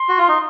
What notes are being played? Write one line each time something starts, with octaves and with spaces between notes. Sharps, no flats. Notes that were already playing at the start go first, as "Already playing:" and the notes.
Already playing: C6
F#4
F4
D#4